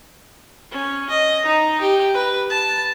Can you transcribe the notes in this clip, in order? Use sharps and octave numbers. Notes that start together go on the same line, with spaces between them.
C#4
D#5
D#4
G4
B4
A5